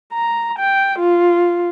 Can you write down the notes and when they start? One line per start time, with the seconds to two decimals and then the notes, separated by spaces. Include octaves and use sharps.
0.13 A#5
0.59 G5
0.99 F4